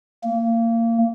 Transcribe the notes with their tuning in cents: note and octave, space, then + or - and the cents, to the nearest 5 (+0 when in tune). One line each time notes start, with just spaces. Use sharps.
A#3 -25